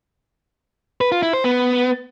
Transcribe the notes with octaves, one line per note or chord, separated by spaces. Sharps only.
B4
F4
E4
C5
B3